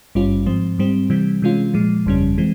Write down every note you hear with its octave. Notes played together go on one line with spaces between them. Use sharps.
G#1 G2 G3 C#4 F4
G#2 F3 C4
G#2 G3 C4
C3 E3 G3 C4
C3 E3 G#3 C#4 F4
A#2 F3 G#3
G1 F2 C#3 G3 C#4
E3 G#3 C4